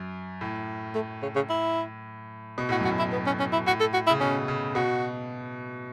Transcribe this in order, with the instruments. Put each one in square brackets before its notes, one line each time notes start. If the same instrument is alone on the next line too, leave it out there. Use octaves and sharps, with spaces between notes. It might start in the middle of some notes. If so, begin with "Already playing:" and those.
Already playing: [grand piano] F#2
A2
[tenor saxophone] A3
C#3
C#3
E4
[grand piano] B2
[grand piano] A2 [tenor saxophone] F#4
[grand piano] F#2 [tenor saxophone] F#4
[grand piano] A2
[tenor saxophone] E4
B3
C#4
C#4
E4
[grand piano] A2 [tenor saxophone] F#4
[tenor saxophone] A4
F#4
E4
[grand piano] C#3
[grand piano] B2 [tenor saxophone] C#4
[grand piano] C#3
[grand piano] B2 [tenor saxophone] F#4